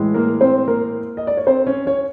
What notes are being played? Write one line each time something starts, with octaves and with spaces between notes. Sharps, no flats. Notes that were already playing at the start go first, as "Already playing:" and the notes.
Already playing: A2 E3 G#3
A#3 A#4
C4 C5
A#3 A#4
D#5
D5
C#5
C4 C5
C#4 C#5
C#4 C#5